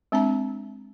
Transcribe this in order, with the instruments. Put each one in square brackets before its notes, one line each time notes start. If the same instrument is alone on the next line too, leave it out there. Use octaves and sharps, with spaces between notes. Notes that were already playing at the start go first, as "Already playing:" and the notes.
[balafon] G#3 C4 D4 A#5